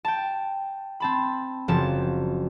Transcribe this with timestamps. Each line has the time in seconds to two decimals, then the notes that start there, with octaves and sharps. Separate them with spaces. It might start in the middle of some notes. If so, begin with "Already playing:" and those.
0.05 G5 A5
1.00 C4 A5 B5
1.68 F#1 F3 A5